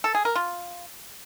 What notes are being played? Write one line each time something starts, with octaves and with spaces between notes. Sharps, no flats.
A4
G#4
A#4
F4